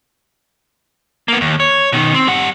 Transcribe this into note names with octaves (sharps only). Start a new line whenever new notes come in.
A#3 B3
D#2
C#5
B2 D#3
C4
G3 F#5